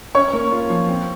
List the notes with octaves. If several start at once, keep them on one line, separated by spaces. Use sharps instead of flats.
C#4 C#5 C#6
A#3
F4
F3
C4